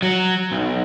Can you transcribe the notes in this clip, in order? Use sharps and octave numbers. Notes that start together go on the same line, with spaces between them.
F#3
B1